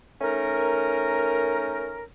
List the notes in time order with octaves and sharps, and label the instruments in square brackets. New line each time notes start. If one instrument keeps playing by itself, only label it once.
[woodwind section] A3 C#4 D#4 A#4